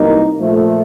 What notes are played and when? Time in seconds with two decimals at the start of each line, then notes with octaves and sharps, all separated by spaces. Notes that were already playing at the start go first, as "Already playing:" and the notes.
Already playing: C2 B2 F#3 A#3 D#4
0.38 A#2 F3 A3